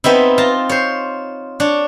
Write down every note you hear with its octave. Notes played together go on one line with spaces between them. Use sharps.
B3 C4 D#4 E4
F4 A5 A#5
C5 C#5
D4 C#5